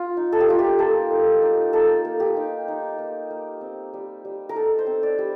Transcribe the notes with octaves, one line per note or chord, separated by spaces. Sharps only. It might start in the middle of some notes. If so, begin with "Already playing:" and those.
Already playing: F4
D#4
A4
G4
A#3 F4
G4
A#3 A4
D#4
D#4
A#3 A4
A#3
G4
D#4
D#4
A#3
A#3
C4
G3
G3
A#4
D#4 A4
C5
C4
D5
G3